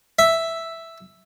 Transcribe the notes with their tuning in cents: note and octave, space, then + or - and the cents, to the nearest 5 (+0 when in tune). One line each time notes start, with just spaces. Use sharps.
E5 +0